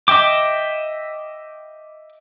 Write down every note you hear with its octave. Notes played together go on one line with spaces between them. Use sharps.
D#5 E5 G5 D6